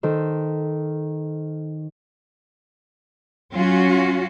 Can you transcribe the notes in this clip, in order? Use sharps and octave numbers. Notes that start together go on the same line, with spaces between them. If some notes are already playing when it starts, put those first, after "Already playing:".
D#3 A4 C5
F#3 C#4 F4 F#4